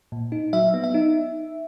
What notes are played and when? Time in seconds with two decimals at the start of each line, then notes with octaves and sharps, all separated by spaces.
0.12 A#2
0.32 D#4
0.53 F#3 E5
0.74 B3
0.84 E5
0.94 D#4